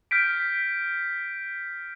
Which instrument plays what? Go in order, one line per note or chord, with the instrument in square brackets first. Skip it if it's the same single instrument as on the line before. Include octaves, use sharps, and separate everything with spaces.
[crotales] F6 G6 B6 D7